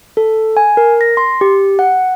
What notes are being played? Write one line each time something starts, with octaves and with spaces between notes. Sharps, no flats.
A4
G#5
A#4
A#6
C6
G4
F#5